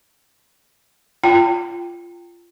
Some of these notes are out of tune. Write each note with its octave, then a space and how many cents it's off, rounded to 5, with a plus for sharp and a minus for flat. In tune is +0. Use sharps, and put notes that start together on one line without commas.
F4 -20 G5 +0 A#5 -45